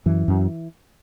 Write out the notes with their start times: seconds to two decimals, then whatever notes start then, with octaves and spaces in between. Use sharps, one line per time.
0.06 F#2 E3
0.28 F#2